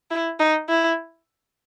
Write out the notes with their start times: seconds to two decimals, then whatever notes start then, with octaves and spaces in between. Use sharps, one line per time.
0.11 E4
0.40 D#4
0.69 E4